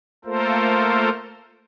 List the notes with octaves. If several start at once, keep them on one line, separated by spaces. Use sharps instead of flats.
A3 A#3 F4 A4 A#4 C5